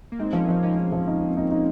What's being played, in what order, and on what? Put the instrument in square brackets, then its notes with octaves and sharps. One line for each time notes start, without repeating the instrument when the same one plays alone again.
[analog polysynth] A#3
[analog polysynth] G#3 C4 [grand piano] D#4
[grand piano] F3 [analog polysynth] A#3 C#4
[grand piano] F3 [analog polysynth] G#3 C4
[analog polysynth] A#3 C#4 [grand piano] D#4
[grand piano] D#4
F3
D#4
C4
D#4
D#4